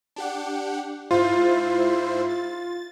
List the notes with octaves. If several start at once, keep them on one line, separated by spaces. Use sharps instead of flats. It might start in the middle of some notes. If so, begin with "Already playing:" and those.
D4 G4 F#5
G#2 E4 F4 C5
A6